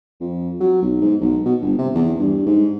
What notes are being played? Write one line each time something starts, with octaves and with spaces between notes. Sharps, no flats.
F2
F#3
B1
G#2
B1
B2
G1
C3
E2
G2
G#2